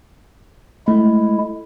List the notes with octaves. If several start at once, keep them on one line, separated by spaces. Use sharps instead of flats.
G#3 A3 E4